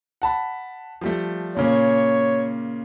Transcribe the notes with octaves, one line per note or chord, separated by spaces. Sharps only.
F#5 A5 B5
F3 G3 A3
A#2 C#3 A#3 C#5